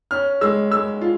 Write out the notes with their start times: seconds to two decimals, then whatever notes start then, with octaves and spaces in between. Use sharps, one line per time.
0.11 C#4 F6
0.41 G#3 E6
0.71 G#3 E6
1.01 F4